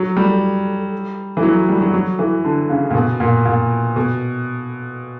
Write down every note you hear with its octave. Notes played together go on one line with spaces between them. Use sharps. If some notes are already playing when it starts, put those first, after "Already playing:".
Already playing: F#3
G3
E3
F#3
G3
F#3
F#3
E3
D3
C#3
A#2
B2
A#2
A#2
B2